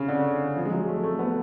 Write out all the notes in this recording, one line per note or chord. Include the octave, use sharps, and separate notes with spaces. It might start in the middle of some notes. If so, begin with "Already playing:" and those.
Already playing: C#3
D3
F3
G#3
F#3
A3
A3
B3